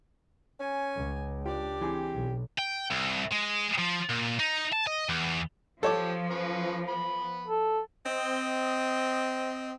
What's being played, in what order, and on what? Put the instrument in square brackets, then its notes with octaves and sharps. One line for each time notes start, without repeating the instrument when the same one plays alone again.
[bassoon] C#4 [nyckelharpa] G#5
[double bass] C#2
[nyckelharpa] D4 D5 [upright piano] F4 [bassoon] G4
[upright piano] E3 C4 G#4
[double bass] B1
[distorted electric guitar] G5
C2
G#3
F3
A#2
D#4
A5
D#5
E2
[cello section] F3 [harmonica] G4 [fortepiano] A4 C#5 D6
[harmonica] C#4 B4
B3 B5
[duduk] A4
[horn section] C4 D#5